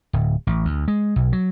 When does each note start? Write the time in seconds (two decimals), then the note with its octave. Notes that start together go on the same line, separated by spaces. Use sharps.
0.13 D1
0.47 A1
0.65 D2
0.88 G#3
1.16 B1
1.33 F#3